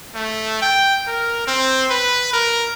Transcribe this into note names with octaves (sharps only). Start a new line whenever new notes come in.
A3
G5
A#4
C4
B4
A#4